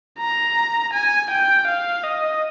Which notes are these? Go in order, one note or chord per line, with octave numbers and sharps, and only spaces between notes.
A#5
G#5
G5
F5
D#5